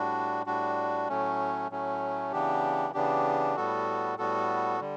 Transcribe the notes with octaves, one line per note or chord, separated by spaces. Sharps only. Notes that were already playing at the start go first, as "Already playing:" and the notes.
Already playing: A2 G3 D4 F#4
A2 G3 D4 F#4
A2 F#3 A3 C#4
A2 F#3 A3 C#4
C#3 E3 B3 D4 G4
C#3 E3 B3 D4 G4
A2 G3 B3 F#4 A4
A2 G3 B3 F#4 A4
D3 G3